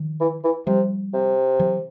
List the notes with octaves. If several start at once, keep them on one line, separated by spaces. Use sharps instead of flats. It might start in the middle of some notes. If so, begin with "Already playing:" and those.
Already playing: D#3 F3
E3
E3
C3 F3 G3
C3
E3 F#3